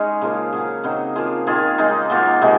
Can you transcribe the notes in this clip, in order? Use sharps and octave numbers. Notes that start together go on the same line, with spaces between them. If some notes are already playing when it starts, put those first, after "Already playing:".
Already playing: G#3 C#4 D#4 G#4
C#3 F3 A#3 F4
F#3 C#4 G#4
C#3 F#3 C4 D#4
F3 A#3 F4 G#4
D#3 A#3 F4 G#4
C#3 G#3 D#4
F#3 A#3 F4
C3 D#3 G#3 D#4